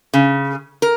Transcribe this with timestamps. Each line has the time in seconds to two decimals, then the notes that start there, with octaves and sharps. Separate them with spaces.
0.14 C#3
0.82 A#4